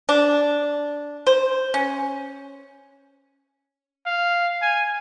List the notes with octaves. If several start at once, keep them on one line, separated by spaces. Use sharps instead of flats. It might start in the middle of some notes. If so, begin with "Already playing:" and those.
D4
C5
C#4
F5
G#5